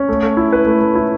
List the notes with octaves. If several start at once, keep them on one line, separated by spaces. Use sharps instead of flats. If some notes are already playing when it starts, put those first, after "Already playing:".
Already playing: C#4
A3
A3
E4
B4
A3
A3
E4